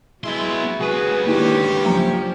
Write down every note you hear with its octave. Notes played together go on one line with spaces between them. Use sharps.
F#3 G#3 B3 E4 C6
C#2 F#4 G#4 B4
G2 D3 D#3 A#3 D#4 E4 G4 C#5
F3 F#3 A#3 C#4 A#5